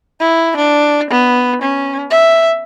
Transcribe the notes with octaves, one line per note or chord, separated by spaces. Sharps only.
E4
D4
B3
C#4
E5